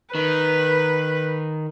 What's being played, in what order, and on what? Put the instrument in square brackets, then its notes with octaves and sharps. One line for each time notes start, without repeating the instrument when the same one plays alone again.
[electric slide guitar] D#3 [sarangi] B4